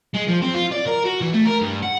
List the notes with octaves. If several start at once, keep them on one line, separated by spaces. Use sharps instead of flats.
G#3
F3
C4
F4
D5
A#4
F#4
E3
A3
A#4
G2
F#5